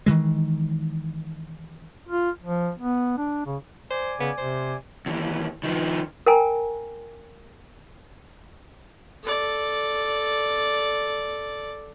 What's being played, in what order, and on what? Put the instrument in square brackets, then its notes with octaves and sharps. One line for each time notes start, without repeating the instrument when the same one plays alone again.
[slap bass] D#3 E3 G#3
[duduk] F4
F3
B3
D4
C#3
[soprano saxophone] C5 [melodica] D5 G#5
[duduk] C#3 [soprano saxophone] B3
[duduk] C3 [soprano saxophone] C5
[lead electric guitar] D#2 E3
D#3 F3
[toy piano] A#4 G5 G#5 A#5
[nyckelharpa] A4 D5